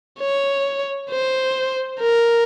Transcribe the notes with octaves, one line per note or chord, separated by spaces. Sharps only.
C#5
C5
A#4